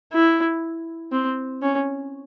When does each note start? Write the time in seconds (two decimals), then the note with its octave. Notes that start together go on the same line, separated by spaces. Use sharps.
0.13 E4
1.12 C4
1.62 C#4